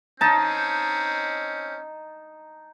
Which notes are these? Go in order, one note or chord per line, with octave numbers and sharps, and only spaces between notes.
C4 C#4 D#4 A5